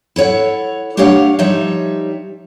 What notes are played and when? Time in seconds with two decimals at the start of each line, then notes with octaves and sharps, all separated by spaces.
0.16 E4 A4 C#5 F#5
0.97 A3 D4 G4 C#5 F5 F#5
1.39 F3 G3 D#4 C#5 E5